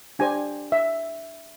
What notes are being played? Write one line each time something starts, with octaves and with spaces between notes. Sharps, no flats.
D4 G4 C5 G#5
E5